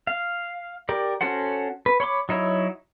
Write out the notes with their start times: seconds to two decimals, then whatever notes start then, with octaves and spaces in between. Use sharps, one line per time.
0.07 F5
0.89 G4 A#4 D5
1.21 C#4 F#4 A4 C5 F#5
1.86 B4
2.00 C#5 B5 C6 D6
2.29 F#3 D#4 E4 C#5